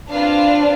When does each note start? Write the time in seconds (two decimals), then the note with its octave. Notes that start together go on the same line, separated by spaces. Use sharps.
0.09 C4 D4 F4 B4 F5 A5